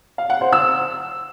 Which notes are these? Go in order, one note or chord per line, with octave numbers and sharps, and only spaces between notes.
F5
F#5
C5
E6